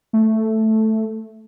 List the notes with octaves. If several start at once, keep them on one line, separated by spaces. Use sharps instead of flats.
A3